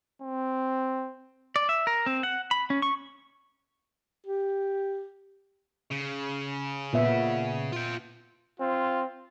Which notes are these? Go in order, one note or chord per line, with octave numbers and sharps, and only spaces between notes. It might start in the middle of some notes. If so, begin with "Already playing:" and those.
C4
D5
E5
A#4
C4
F#5
B5
C#4
C#6
G4
C#3
A#2 B3 E5
F4 G5
C4 F4